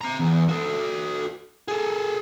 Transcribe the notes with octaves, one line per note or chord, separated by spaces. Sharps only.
C4 A#5
E2
F#4 A4
G#4 A4